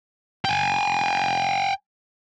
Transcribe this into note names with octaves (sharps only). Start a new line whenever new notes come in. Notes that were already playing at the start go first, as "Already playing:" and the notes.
G5 G#5